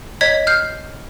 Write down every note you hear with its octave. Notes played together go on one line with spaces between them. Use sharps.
C#5 D#5 G#6 B6
F6 G6 C7